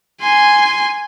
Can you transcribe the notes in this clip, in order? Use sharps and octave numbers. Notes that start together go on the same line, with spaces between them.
G#5 C6